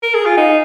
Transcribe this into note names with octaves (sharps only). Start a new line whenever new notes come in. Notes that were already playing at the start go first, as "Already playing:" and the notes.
A#4
G#4
F4 G#5
D#4 F5